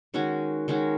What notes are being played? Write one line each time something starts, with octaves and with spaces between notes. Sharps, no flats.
D#3 G#3 C#4 F#4
D#3 G#3 C#4 F#4